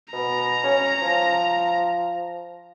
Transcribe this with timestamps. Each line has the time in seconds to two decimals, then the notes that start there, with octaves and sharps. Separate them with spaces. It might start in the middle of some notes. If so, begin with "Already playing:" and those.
0.13 B2 A#5
0.64 C#4
1.02 F3